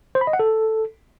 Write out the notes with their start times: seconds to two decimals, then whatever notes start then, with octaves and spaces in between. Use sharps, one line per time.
0.15 C5
0.21 B5
0.27 D#5
0.33 F#5
0.39 A4